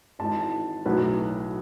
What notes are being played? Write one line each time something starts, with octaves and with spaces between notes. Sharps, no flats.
G#1 G#2 E3 A5
B1 A2 F#3 B4